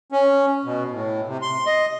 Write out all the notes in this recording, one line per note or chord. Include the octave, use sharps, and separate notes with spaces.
C#4
B2
A2
C3
C6
D#5